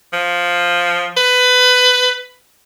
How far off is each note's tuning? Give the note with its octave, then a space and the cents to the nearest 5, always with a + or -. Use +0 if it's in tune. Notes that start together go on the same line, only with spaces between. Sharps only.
F3 +5
B4 +20